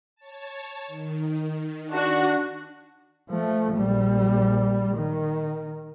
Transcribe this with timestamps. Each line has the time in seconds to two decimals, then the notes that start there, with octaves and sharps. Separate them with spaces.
0.16 C#5 A5
0.87 D#3
1.91 D4 F#4
3.29 F3 A3
3.75 A#1 G3
4.97 D#3